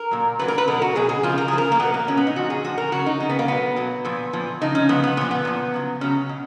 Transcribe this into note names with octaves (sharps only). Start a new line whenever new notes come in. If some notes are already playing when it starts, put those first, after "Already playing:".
Already playing: A#4
A#2 F#3
A#2 F#3 B4
A#4
B4
B2 F#3 A#4
F#4
B2 F#3 G#4
G#4
C#3 F3 F4
A#4
C#3 F3 G#4
A#4
A#3
B2 F#3 B3
A#3
B2 F#3 C#4
B3
D#4
A#2 F3 F#4
G#4
A#2 F3 F#4
A#4
C#3 F#3 F#4
D#4
C#3 F#3 C#4
B3
A#3
B2 F#3 B3
B2 F#3
A#2 F3
A#2 F3
C#3 F3 D#4
C#4
C#3 F3 B3
B3
A#2 F3 B3
B3
A#2 F3
C#3 F#3
C#3 F#3 C#4
B2